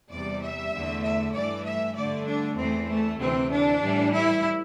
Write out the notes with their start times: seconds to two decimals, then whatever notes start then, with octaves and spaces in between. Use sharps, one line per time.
0.11 E2 C3 G3 D5
0.41 E5
0.72 E2 D3 A3
1.03 E5
1.34 G2 E3 A3 D5
1.66 E5
1.96 G2 D3 A3 D5
2.27 D4
2.57 E2 E3 A3 C4
2.88 A3
3.19 D2 C3 E3 C4
3.49 D4
3.80 A2 E3 G3
4.11 E4